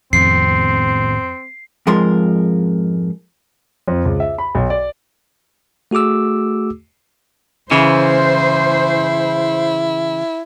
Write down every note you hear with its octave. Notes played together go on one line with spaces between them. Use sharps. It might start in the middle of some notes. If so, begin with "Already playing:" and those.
F2 A2 D#3 B3 C4 C7
F2 G#2 F3 G#3 A#4 C6
F2
C#2
E5
B5
B1
D5
A3 F#4 G#4 D6 E6
C#3 E3 E4 C5